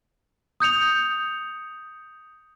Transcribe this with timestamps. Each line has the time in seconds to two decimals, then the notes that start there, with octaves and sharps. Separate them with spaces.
0.60 D#6 G6 C#7 F7